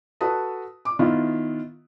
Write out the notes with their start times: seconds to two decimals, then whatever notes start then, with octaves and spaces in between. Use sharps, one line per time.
0.21 F#4 A4 B4 A5 D#6
0.85 D6
0.99 D#3 B3 E4 F4